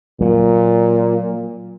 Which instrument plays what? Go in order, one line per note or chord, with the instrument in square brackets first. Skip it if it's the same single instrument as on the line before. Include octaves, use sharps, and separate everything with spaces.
[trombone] A#2 [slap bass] F#3